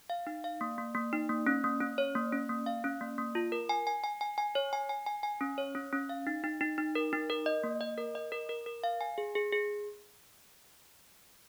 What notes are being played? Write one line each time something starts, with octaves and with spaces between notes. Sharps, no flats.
F5
D#4
F5
A#3
A#3
A#3
D#4
A#3
C#4
A#3
C#4
C#5
A#3
C#4
A#3
F5
C#4
A#3
A#3
F4
A#4
G#5
G#5
G#5
G#5
G#5
C#5
G#5
G#5
G#5
G#5
C#4
C#5
C#4
C#4
F5
D#4
D#4
D#4
D#4
A#4
D#4
A#4
D#5
A#3
D#5
A#4
D#5
A#4
A#4
A#4
F5
G#5
G#4
G#4
G#4